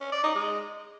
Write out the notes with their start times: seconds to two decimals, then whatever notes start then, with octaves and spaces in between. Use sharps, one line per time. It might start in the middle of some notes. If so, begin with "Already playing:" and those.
0.01 C#4
0.12 D5
0.24 D#4
0.35 G#3